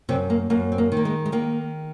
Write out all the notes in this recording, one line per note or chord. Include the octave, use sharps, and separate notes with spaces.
F#2 C3 C4
A#3
F#2 A#3
C4
A#3
D#3
A#3
G#3
G#3
D#3 A#3